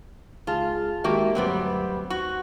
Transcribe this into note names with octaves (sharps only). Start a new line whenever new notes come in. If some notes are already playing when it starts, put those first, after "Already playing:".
C#2 F4 G#4 A5
D#3 G#3 A#3 F#4 G4 E5
G1 D2 F#3 G3 B3 C4
F#4 C#6